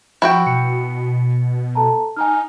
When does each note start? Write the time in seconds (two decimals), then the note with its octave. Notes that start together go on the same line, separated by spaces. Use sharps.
0.22 F3 E4 F#4 G5
0.47 B2 C#7
1.75 A4 A5 A#5
2.16 D#4 G#5 A#5 F6